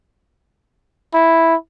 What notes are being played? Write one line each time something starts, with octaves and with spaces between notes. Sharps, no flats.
E4